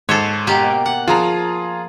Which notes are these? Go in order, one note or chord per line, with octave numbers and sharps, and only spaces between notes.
G#2 A4 C5 C#5
B2 A#3 G4
F#5
F3 F4 G#4 A#5